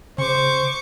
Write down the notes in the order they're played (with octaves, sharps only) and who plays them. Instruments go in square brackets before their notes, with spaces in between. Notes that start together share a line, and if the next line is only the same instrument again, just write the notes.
[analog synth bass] C#3 [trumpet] C5 [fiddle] C#6 D6